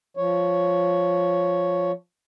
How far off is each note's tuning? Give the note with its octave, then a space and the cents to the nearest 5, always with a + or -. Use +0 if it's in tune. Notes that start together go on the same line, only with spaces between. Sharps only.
F3 +0 C#5 +0